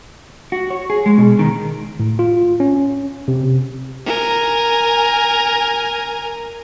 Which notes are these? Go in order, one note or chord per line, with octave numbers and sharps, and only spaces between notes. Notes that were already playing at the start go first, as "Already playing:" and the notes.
F#4
C#5
G#4
G#3
B2
D#3
A2
F4
C#4
C3
A#4 G#5